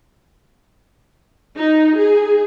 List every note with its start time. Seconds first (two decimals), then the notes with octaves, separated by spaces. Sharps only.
1.56 D#4
1.96 G#4